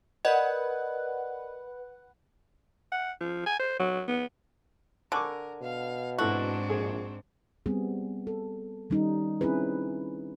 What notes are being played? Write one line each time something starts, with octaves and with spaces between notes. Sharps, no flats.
A#4 B4 D5 D#5 F#5
F#5
F3
G#5
C5
F#3
B3
D3 A#4 G#5 C#6 D6
B2 F5
G#2 C4 D4 E4 F#4 A4
A#1 G#4
G3 B3 C4 G#4
A4
D#3 G3 C#4 D#4
C4 C#4 E4 G#4 B4